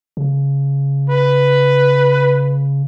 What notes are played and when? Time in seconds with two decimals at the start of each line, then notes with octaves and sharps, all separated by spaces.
0.17 C#3
1.10 B4